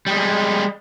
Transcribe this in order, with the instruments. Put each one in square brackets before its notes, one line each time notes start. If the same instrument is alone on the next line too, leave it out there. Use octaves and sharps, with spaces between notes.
[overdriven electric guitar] G3 G#3